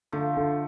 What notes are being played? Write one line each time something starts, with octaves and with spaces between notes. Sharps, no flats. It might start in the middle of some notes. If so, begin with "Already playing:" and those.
D3 F3 A3
D3